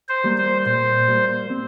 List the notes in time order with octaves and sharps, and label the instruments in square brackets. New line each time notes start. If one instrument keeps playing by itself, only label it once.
[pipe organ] C5
[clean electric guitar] G3 A#3
[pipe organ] C5
[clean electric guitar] A#2 [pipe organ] C5
[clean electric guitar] G3 A#3
C4